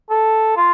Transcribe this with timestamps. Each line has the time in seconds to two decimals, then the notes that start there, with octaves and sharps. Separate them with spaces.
0.10 A4
0.57 F4